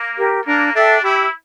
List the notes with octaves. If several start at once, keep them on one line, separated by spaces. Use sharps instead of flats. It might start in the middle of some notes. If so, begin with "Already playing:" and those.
Already playing: A#3
G4 A#4
A#3 D4
D4 A4 E5 G5
E4 G4